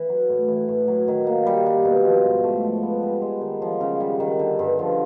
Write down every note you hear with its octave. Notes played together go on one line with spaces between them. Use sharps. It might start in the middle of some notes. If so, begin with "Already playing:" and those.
Already playing: E3
F#3
A2
E3
A2
F#3
D#3
A#3
G3
G3
B2
F3
G#2
A3
F3
B3
G3
G#3
D#3
F3
C#3
G3
D#3
D3
G2
F3